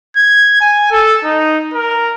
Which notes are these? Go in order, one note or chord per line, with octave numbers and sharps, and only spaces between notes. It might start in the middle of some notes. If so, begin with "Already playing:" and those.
G#6
G#5
A4
D#4
A#4